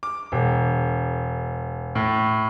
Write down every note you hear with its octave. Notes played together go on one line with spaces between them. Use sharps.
D6
E1
A2